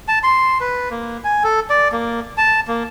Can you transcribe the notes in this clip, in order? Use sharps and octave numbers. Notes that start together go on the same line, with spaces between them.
A5
C6
B4
A#3
G#5
A4
D5
A#3
A5
A#3